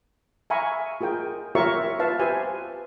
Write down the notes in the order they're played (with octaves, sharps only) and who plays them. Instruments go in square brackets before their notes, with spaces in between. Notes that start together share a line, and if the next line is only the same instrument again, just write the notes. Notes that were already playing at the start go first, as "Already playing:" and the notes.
[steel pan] E5 F5 G#5 A#5 B5 C#6
F4 G#4 A#4 G5
F4 G4 A#4 C#5 E5 C#6
F4 B4 E5 F5 A5
G4 B4 C5 G#5